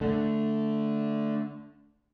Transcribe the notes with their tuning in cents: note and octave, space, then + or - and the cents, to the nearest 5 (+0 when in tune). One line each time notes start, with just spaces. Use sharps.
D3 +0 A3 +0